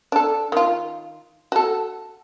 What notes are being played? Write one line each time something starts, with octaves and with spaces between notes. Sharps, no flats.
D4 A4
D#3 F4
F#4 A4